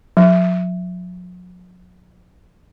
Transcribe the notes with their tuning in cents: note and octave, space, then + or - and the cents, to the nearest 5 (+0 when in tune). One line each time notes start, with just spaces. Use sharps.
F#3 -45